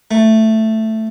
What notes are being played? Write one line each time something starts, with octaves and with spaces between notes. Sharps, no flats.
A3